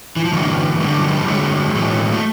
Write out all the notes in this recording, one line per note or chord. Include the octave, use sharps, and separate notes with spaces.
E3
F3
G2 D3 E3 F#3
G2 D3 G#3
G3
F#3
F3 G3
G2 D3 F#3 G#3
A2 E3 F#3 G#3
A3